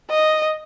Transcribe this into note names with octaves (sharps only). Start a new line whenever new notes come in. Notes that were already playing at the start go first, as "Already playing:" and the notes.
D#5